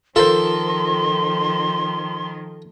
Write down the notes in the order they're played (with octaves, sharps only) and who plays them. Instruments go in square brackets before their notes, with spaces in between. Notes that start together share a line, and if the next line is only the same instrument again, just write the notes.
[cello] D#3 F3 [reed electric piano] F4 A#4 C5 [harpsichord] A4 [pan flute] C6